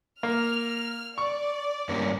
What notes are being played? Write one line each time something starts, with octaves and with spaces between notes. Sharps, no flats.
A#3 F6
D5 C#6
G2 A#3 C#4